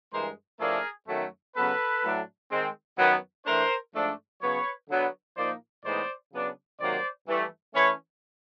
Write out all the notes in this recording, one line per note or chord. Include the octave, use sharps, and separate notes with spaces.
G2 E3 G#3 A#4 C5
A2 F3 A3 D4 G#4 A#4
F#2 D#3 F#3 A3
C#3 F#3 B3 A4 B4
A2 F#3 A3 D4
D#3 G#3 C4
F#2 D#3 F#3 B3
E3 A3 D4 A#4 C5
G#2 F3 A3 D4
C#3 F#3 B3 B4 C#5
D3 F#3 B3
A#2 F3 A#3 D#4 C5 D5
A2 E3 G#3 B3 D#4 C5 D5
C#3 F#3 B3 D4
C3 D#3 F#3 A#3 C5 D5
G2 E3 A3
E3 A3 C#4 B4 C#5